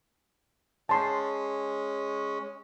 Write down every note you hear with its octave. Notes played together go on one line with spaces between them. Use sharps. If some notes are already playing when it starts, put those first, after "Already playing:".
G#3 C#4 A5 C6